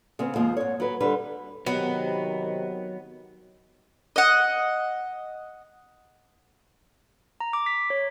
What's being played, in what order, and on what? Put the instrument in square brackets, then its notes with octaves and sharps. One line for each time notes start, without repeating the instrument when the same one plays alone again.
[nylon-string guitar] C#3 B3 C4
D#2 F3 G#3 A#3
G#2 C#5
F#3 B4
D3 G3 B4
[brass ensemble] C3 D#3 [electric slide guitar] F#3 [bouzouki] B3
[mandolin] D#5 F#5
[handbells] A#5
D6
B6
C#5